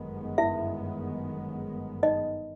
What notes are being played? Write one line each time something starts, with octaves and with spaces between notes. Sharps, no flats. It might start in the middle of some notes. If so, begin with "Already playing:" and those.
Already playing: G1 F#2 D#3 G#3 B3
E4 E5
D#4 D#5